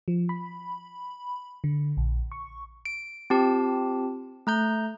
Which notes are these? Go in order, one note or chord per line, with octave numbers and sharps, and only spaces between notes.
F3
B5
D3
A#1
C#6
D7
C4 F4 G4 A5
A3 A#5 G6